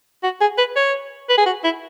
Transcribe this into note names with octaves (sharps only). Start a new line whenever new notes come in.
F#4
G#4
B4
C#5
B4
G#4
F#4
E4